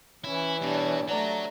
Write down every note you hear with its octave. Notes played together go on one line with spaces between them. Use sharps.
E3 C#4 E4
B2 G3 D4 C#5
A3 C#5 D5 F#5 A#5